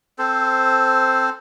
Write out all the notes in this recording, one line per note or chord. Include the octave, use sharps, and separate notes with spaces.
C4 A4 C5